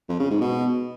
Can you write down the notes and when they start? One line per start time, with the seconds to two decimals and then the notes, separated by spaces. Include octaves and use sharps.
0.09 F2
0.20 C#3
0.30 G#2
0.41 B2